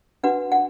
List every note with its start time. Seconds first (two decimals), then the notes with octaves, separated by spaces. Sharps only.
0.23 D4 F#4 B4 F#5
0.52 F#5